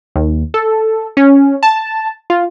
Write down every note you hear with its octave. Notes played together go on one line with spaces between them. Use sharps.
D#2
A4
C#4
A5
F4